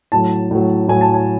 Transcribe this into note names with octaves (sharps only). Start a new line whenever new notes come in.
A2 F#3 A5
A2 F#3
A2 F#3 G#5
A5
G#5